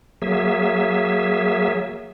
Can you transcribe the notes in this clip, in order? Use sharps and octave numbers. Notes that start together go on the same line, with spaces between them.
F#3 A#3 G#4 E5